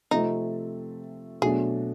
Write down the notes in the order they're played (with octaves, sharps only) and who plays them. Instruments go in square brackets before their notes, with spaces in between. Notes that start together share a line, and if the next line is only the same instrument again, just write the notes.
[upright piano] C3 F3 A3 C4 [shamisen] D#4
[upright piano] B2 F#3 A3 D4 [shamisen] G#4